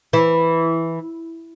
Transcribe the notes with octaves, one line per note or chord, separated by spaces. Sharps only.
E3